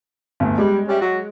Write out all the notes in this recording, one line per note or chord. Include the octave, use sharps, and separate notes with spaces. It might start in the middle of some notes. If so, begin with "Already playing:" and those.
G1 D2
G3 G#3
G3 C#4 E5
F#3 F#4